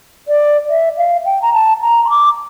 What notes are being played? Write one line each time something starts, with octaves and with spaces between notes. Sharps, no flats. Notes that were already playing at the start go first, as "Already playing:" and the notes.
D5
E5
F5
G5
A#5
A5
A#5
C6
D6